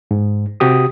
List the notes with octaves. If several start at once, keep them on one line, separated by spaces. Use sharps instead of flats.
G#2
C3 F#4 G4 D#6